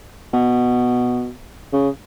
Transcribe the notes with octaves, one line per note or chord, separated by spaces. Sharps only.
B2
C#3